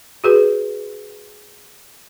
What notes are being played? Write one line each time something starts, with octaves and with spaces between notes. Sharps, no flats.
F#4 G#4 B4